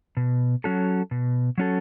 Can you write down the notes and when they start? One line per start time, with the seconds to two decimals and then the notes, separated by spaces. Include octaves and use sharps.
0.17 B2
0.64 F#3 C#4 F#4 A4
1.11 B2
1.58 F#3 C#4 F#4 A4